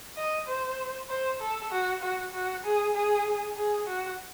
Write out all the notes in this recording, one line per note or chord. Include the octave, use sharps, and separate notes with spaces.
D#5
C5
C5
A4
F#4
F#4
F#4
G#4
G#4
G#4
F#4